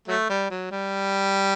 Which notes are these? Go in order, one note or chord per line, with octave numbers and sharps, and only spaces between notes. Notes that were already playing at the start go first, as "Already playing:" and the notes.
F#3 A3
G3
F#3
G3